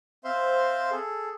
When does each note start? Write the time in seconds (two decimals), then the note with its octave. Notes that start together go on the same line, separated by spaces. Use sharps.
0.24 C4 C5 E5 F5 C6
0.91 G#4 A4